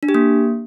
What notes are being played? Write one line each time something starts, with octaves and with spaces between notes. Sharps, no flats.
D4
G4
A#3